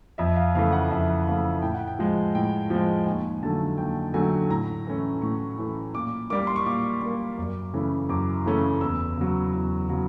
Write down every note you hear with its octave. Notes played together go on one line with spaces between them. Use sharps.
F2 E5
F5
C#3 E3 A3 F5
F#5
F2 E5
C#3 E3 A3 F5
A2 G5
F#5
G5
F3 G#3
A2 G5
F3 G#3
D#2 G#5
D3 F#3 A3 A5
D#2 G5
D3 F#3 A3 G#5
A2 A#5
E3 A3 C#4
A2 C#6
E3 A3 C#4
A#2 D6
G3 A#3 D6
C6
C#6
A#2 D6
G3 A#3
F#2
C#3 E3 A3 C#4
F#2 D6
C#3 E3 A3 C#4
E2 E6
C#3 F#3
E2
C#3 F#3